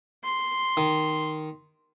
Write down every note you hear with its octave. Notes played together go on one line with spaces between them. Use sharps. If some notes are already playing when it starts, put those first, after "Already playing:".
C6
D#3